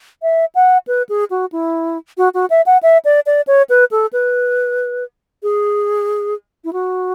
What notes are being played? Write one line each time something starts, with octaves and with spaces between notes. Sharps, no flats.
E5
F#5
B4
G#4
F#4
E4
F#4
F#4
E5
F#5
E5
D5
D5
C#5
B4
A4
B4
G#4
E4
F#4